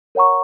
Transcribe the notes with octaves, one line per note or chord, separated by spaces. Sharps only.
A#4 C#5 F#5 A#5 C#6